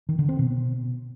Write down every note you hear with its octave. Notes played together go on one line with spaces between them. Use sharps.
D#3
D3
C4
B2